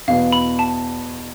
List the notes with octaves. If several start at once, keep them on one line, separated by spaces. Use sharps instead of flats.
E2 B2 B3 F5
B5
A5